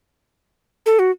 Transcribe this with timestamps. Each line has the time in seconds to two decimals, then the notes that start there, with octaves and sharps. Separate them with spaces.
0.86 A4
0.99 F#4